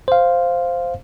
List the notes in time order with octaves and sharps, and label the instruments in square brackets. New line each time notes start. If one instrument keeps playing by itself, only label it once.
[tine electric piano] C5 F5